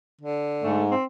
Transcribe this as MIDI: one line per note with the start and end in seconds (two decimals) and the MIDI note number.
0.21 0.79 50
0.63 0.95 44
0.63 0.85 57
0.91 1.04 60